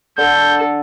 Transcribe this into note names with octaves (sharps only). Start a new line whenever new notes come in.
D3 A4 G6